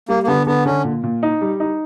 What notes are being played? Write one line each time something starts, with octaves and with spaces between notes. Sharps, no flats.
G3 A#3
A#3
D3 B3
D3 B3
D3 C#4
A#2
A#2
D#4
G3
D#4